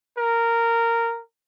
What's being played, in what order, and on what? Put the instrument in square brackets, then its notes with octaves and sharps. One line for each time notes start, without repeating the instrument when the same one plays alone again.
[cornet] A#4